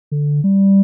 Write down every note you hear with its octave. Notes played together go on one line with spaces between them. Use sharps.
D3
G3